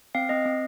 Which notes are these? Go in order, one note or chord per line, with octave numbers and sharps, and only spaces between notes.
C4 F5
C4 D#5
C4